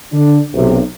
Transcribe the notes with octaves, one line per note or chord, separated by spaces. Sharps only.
D3 D4
B1 C3